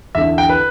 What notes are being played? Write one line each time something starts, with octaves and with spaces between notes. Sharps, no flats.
E2 D3 E5
G5
B4